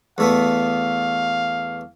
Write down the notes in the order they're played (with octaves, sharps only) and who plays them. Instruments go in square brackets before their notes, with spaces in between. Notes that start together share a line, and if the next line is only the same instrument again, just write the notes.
[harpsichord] E2 A3 B3 [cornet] F5